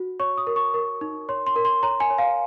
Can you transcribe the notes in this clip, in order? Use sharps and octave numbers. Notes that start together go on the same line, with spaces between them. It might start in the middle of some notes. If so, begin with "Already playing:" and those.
Already playing: F#4
C#5 C#6
D#6
A#4
C#6
A#4
D#4
C#5 C6
C6
A#4
C6
C#5 A#5
G#5
C#5
F5